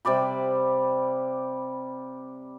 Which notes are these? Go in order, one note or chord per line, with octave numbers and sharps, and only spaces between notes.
C3 G3 D5 B5